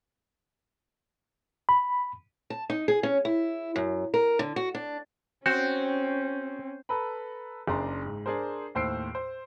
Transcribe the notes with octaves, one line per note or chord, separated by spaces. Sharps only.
B5
A5
D#4
G#4
C#4
E4
F#2
A#4
D3
F#4
D4
C4 C#4 F#4 G6
A4 B4 A#5 B5
F#1 C#3 D4 A#5 C6
G#2
D4 G#4 A#4 C5
D#2 A2 C5 E6 C7 D7
C5